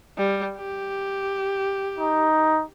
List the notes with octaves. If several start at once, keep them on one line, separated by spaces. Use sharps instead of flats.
G3
G4
D#4